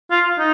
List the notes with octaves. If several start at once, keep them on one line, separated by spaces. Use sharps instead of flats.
F4
D#4